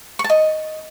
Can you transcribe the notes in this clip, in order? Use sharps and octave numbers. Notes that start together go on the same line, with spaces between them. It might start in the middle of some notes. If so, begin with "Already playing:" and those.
C#6
A5
D#5